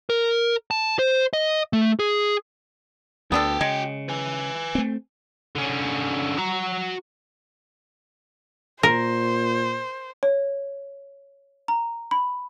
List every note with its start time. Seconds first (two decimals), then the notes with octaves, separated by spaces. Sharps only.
0.10 A#4
0.71 A5
0.99 C5
1.33 D#5
1.73 A3
1.99 G#4
3.32 D2 B3 D4 F#4 A4 G5
3.61 C#3 G#3
4.09 B4 G#5
4.75 A3 C4
5.56 D3 C#4
6.38 F#4 A#5
8.83 A#2 A#4 C5
10.23 C#5
11.68 A#5
12.11 B5